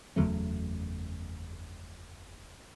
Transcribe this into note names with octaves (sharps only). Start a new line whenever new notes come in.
F#1 E2 F#3 A3